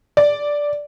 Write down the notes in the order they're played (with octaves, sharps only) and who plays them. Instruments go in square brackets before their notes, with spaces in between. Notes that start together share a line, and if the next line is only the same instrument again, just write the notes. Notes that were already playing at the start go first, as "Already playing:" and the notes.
[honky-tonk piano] D5